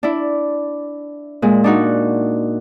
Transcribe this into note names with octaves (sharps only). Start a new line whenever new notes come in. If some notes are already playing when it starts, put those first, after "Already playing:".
D4 E4
A#2 G#3
D4 D#4 F#4